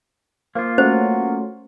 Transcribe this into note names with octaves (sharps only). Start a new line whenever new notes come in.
F3 A#3 F4
F#3 A3 C#4 F#4 C5